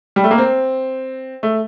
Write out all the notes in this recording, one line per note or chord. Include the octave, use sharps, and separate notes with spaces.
G3
A3
A#3
C4
A3